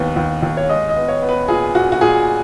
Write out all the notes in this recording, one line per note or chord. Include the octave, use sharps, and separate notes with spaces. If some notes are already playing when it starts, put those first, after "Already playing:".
Already playing: D#2 B3
D#2
D#2
C#5
G#3 D#5
D#5
B3
C#5
B3
B4
A#2 G#4
A#2 F#4
F#4
A#2 G#4